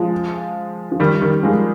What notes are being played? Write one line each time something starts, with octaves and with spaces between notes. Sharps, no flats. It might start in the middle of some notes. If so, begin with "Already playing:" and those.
Already playing: F3 G#3
F3
D#3 G3
D#3 G3
F3 G#3